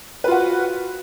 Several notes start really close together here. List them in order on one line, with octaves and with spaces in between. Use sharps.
B4 F4 F#4